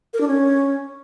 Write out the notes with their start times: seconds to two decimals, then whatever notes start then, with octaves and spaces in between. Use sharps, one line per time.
0.14 A#4
0.21 D4
0.28 C#4